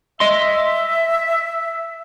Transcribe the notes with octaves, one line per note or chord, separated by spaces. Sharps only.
D#5 E5 C6